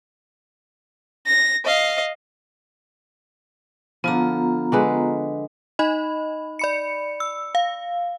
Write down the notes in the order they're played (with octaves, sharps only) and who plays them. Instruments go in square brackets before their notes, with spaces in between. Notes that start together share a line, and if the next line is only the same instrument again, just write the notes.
[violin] A#6
D#5 F5
[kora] D3 F3 [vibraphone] B3 F4 A#5
[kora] D3 G#3 B4
[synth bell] D#4 D#5 B5
D5 B5 C#7
E6
F5